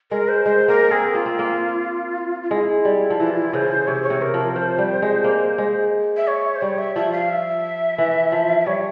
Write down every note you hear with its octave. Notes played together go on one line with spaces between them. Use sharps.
G#3 A#4
C5
G#3 C5
A#3 A#4
C4 G#4
A#3 F4
C4
A#3
F4
G#3 E4
G3
F3
E3 E4
F4
E4
C#3 C5
C3 C#5
C5
C#5
C3
A#4
F3
F3 C5
G3
G#3
A#3
G#3
E5
C#5
C5
G3 C#5
E5
F3 E5
F5
E5
E3
F3
E5
G3 C#5